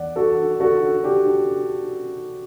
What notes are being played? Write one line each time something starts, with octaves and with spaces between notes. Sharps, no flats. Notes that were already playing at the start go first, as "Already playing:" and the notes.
Already playing: E2 D5 F#5
D4 F#4 A4
D4 F#4 A4
D4 G4